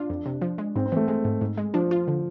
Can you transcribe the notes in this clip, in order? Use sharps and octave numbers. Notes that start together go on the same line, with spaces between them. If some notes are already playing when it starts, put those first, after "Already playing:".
Already playing: D4 F4
F2
C3
F3
G#3
G#2 C4
C4
E3 A3
G#3
G#2
G#2
G#3
F3 D4
F4
D3